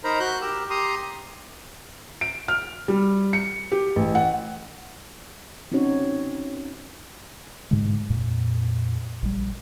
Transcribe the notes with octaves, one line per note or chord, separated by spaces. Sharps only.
D#4 A#4 C5 A#5 B5
F#4 F#6 G6
G4 A#4 E6
G4 A#5 C6 D#6
D7
F6
G3
C#7
G4
A1
F#5
C4 C#4 D#4 F#4 C#5
G#2 B2 D3 G#3
F2 A#2
A#1 G3